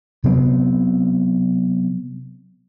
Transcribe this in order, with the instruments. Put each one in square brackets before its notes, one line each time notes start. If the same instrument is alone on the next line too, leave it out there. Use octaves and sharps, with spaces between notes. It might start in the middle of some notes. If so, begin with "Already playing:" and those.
[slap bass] C3 F#3 B3 C4